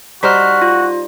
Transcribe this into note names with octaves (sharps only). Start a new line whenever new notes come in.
G3 D#4 F#4 C5 F6 B6
F4